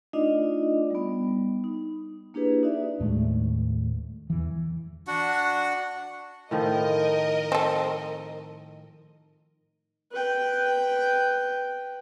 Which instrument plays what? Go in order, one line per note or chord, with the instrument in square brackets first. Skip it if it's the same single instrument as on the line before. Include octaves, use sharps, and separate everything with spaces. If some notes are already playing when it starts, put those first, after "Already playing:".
[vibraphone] A3 D4 D#4 F4 D5 D#5
G3 B3
D#4
A#3 D4 E4 G4 G#4 B4
D#4 F#4 D5 E5
[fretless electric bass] D#2 A2 G#3 A3
E2 E3
[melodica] D4 F#4 F#5
[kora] A2 D#3 F3 [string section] A#4 D#5
[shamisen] C4 A4
[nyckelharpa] B4 G5